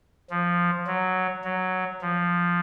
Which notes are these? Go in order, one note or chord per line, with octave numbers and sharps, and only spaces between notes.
F3
F#3
F#3
F3